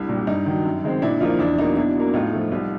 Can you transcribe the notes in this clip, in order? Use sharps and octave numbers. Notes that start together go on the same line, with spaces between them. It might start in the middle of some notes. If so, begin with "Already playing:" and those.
Already playing: C2 D4 E4
A#2 G3
G2 D#4
D#3 F#3
F#2
D#3 G#3 C4
A#2 D4 E4
F3 A#3 D#4 F4
E2 D4 E4
B2 F#3 A#3 D#4
B2 D4 E4
F#3 A#3
A2 D#4 F4
F3 A3
C2